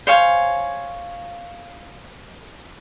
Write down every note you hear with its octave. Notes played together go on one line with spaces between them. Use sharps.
C5 C#5 F5 G#5